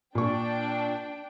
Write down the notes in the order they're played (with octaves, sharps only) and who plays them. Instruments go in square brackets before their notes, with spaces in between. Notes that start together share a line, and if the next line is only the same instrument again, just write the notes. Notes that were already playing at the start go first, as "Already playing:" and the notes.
[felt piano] A#2 C#6 [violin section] D4 G5